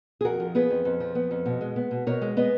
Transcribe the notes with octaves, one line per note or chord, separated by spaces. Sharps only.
G#4
F2 F#4 A#4
F3
B3 G#4 B4
F2
F2
F3
B3
F2
B2
G#3
B3
B2
B2 A#4 C#5
G#3
B3 B4 D#5